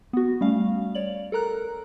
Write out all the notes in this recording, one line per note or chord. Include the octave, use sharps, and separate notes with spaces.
B3 F#4
G3 A3 C#4 F5
C#5 D5 F#7
A4 A#4 A#5 F#6